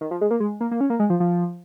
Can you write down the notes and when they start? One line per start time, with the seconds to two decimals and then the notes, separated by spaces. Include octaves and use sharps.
0.01 D#3
0.11 F3
0.21 G#3
0.31 A#3
0.40 G#3
0.61 A#3
0.71 A#3
0.81 C#4
0.90 A#3
1.00 G#3
1.10 F3
1.20 F3